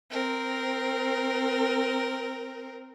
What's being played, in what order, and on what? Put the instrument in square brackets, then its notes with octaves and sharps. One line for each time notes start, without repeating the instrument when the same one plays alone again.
[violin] C4 A#4